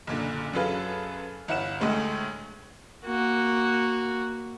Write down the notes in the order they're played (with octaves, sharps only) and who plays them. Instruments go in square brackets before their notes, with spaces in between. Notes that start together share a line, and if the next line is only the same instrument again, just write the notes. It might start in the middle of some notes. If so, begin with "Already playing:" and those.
[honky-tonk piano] F#1 A#2 D3
F#2 F#3 G#4 A4 B4 F5
G1 E4 F#5 E7
D2 A2 G#3 A3
[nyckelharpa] A#3 F#4